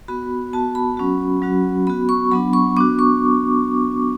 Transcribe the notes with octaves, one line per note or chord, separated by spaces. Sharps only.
B3 F#4 B5
B3 F#4 A5
B5
F#3 C#4 F#4
F#3 C#4 F#4
B3 F#4 B5
C#6
F#3 B3 D4 B5
C#6
B3 D4 F#4 D6
C#6